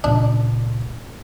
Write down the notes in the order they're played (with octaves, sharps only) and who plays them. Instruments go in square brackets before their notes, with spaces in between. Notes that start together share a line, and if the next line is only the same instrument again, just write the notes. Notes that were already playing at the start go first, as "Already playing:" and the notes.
[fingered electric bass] C#2 A#2 C#3 [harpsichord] D4